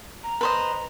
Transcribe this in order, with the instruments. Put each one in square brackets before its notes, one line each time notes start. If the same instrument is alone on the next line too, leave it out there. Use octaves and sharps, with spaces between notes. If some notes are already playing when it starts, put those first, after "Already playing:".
[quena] A#5
[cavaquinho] B4 C5 D#5